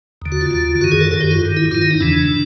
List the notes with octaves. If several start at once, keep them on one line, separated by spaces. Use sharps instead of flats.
D#2 D3
F#4
F4
D#2 D3
F#2 D#3 F#4
G#4
A4
F#2 D#3 A4
G4
F4
G2 D#3
E4
G2 D#3 F4
E4
D#4
E2 C#3 E3 D4